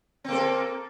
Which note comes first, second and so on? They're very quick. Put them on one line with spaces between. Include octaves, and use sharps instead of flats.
C4 A#3 A4